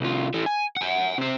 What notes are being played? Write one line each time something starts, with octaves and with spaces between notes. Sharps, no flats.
C2 F4
E3 A3
G#5
F#5 G#5
C3 C5